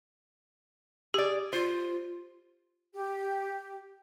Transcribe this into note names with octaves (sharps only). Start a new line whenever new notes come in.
G4 G#4 D5
F4 C5
G4